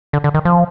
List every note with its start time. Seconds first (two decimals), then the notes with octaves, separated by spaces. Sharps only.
0.13 D3
0.24 D3
0.34 D#3
0.45 F3